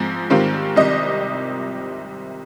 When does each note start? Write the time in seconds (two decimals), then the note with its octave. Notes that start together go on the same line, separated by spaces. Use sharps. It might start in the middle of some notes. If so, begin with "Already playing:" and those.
Already playing: G#2 F3 C4
0.30 G#2 D#3 G3 C4 F4
0.76 C2 C3 D#3 G3 D#5